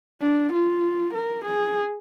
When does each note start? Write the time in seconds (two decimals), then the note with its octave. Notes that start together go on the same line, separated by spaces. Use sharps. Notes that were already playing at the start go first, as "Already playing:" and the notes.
0.21 D4
0.52 F4
1.14 A#4
1.45 G#4